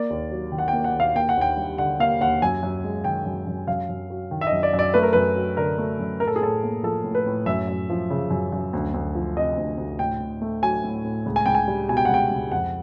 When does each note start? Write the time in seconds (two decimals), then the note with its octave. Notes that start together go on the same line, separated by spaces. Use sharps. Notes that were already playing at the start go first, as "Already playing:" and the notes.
Already playing: A#3 D5
0.10 D#2
0.31 F#3
0.52 D#3
0.58 F#5
0.68 G5
0.73 A#3
0.84 F#5
0.95 D#2
1.00 F5
1.16 A#3 G5
1.29 F#5
1.37 D#2 G5
1.57 G3
1.78 D3 F#5
1.99 A#3 F5
2.20 D#2 F#5
2.42 F#2 G#5
2.63 F#2
2.84 G#3
3.04 D#3 G5
3.25 F#2
3.47 F#2
3.68 F#2 F5
3.89 F#2
4.10 F#3
4.31 D#3
4.41 E5
4.47 D#5
4.52 F#2
4.63 D5
4.74 F#2
4.79 D5
4.94 A3 B4
5.03 A#4
5.13 F#2 B4
5.36 F#3
5.57 D3 A#4
5.78 A3
6.00 F#2
6.20 A2 A#4
6.27 A4
6.36 G#4
6.41 A2 A4
6.63 A#3
6.83 F3 A4
7.04 A2
7.15 B4
7.26 A2
7.46 F#2 E5
7.68 F#2
7.90 F3
8.10 C#3
8.30 F#2
8.52 F#2
8.73 D2
8.94 D2
9.15 F3
9.37 C3 D#5
9.58 D2
9.78 D2
9.99 A2 G5
10.20 A2
10.42 A3
10.62 F#3 G#5
10.84 A2
11.05 A2
11.26 C#2
11.36 G#5
11.46 C#2 G5
11.55 G#5
11.68 G3
11.88 B2 G#5
11.97 G5
12.05 F#5
12.09 C#2 G5
12.31 C#2
12.51 F2 F#5